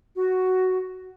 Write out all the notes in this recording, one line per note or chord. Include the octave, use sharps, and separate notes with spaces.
F#4